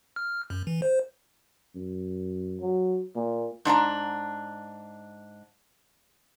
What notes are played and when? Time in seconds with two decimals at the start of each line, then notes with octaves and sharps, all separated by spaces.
0.16 F6
0.50 F#2
0.67 E3
0.82 C5
1.75 F#2
2.61 F#3
3.16 A#2 A#3
3.65 G#2 D4 A5 A#5